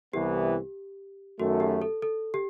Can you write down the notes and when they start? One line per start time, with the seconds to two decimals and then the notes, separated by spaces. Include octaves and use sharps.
0.13 C2 C3 E3 B3 G4
1.40 F#2 D#3 A3 F#4
1.60 G4
1.82 A4
2.02 A4
2.34 G4